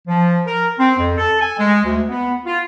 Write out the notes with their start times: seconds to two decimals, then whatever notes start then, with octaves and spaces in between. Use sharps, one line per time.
0.08 F3
0.47 A#4
0.78 C4
0.98 F2
1.18 A4
1.40 G#5
1.58 G#3
1.84 D2
2.09 B3
2.45 F4